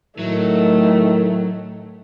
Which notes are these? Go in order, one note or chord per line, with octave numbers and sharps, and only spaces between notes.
A2 D#3 F#3 A3